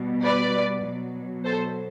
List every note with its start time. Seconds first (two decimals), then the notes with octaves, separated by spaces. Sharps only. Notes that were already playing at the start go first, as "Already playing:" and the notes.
Already playing: B2 G3
0.24 B4 D5
0.84 B2 F#3
1.45 A4 C5